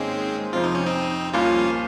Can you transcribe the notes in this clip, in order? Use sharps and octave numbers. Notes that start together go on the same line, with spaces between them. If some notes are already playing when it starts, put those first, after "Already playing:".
Already playing: G#2 D#3 G#3 A#3 C4 C#4 G#4
F2 C3 F3 C4 F4
D#4
C#4
C4 D#4
C2 A#2 F3 A#3 C#4 F4